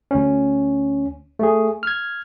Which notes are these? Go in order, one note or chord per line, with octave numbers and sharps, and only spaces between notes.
D2 C#4
A3 G#4
F6 G#6